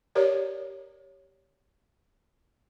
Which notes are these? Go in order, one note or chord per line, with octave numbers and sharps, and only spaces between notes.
G4 A#4 C#5 D5